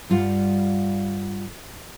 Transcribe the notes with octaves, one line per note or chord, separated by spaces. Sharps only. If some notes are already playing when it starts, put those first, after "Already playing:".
G2 G3 F4 F5 F#5